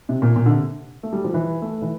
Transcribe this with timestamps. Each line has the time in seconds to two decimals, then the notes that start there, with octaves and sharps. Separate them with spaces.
0.09 C3
0.22 A#2
0.36 A#2
0.46 D3
0.50 C3
1.03 A3
1.13 G3
1.24 F3
1.34 E3
1.62 A3
1.82 E3